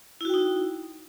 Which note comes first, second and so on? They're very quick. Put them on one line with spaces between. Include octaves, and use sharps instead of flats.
E4 F#4 G5 D#4